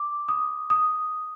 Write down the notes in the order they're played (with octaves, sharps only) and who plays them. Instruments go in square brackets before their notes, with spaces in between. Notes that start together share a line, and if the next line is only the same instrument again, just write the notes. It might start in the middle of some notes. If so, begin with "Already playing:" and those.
Already playing: [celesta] D6
D#6
D#6